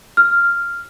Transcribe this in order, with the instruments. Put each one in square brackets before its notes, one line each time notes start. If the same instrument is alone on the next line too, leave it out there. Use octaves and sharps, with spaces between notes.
[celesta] F6